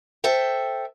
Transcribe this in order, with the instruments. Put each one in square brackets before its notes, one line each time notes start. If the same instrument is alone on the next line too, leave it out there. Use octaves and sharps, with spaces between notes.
[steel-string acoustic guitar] A4 C5 E5 G5